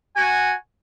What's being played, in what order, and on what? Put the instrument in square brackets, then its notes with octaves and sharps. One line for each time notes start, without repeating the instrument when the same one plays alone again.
[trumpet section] F#4 [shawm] G#5